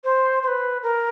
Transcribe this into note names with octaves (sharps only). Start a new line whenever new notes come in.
C5
C5
B4
A#4